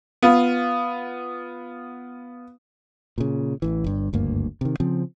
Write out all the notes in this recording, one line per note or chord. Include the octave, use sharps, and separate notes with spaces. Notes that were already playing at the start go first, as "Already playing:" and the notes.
B3 F4
A#2 C#3
A1 E3
G1 G2
F#1 D2 G2 A#3
C3 D#3
C#3 F3 C4